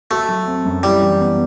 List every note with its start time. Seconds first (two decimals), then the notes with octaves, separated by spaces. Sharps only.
0.10 A3 F#4
0.29 F#3
0.47 C4
0.65 F#2
0.83 G3 E4
1.02 E3
1.20 B3